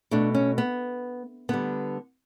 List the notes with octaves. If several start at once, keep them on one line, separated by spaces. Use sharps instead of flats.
B2 A3 D4
C#4
B3
D3 G3 B3